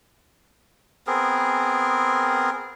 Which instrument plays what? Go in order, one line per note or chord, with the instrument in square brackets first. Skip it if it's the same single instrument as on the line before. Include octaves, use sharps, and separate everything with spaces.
[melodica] B3 C4 G#4 A#4